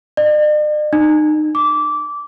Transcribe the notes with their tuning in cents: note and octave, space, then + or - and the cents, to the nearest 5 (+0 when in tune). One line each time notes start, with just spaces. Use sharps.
D5 +45
D#4 -30
D6 -15